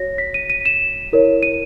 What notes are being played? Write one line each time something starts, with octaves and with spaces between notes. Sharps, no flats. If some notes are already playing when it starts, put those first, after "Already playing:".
Already playing: F#4 C#5 A#6
B6
D#7
D#7
E7
E4 A#4 C#5
D#7